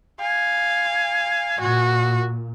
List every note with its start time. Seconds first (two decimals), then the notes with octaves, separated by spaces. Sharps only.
0.20 F5 G#5
1.60 A#2 F#4